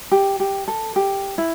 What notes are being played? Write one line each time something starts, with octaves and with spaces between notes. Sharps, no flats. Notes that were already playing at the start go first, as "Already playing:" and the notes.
G4
G4
A4
G4
E4